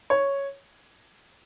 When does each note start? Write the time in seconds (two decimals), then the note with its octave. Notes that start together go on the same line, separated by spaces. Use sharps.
0.10 C#5